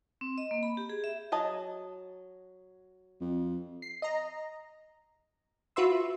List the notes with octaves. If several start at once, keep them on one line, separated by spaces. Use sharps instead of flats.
C4
D#5
A#3
B5
G4
G#4
E5
F#3 D#5 A5
F2
C7
D#5 A#5
F4 F#4 B4 E5 C6 E6